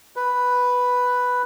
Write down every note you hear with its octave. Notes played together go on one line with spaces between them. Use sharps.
B4